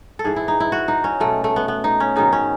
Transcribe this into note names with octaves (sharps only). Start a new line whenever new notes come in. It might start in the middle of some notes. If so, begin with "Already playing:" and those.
A4
G#2 E3 G#4
E4
D#4
E4
F#4
D#4
C#4
B2 F#3 A3
A3
B3
B3
D#4
C#4
G#2 D#3 F#3 D#4
C#4